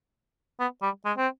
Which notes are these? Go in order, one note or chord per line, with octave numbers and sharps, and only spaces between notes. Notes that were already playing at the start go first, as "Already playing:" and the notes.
B3
G3
G#3
C4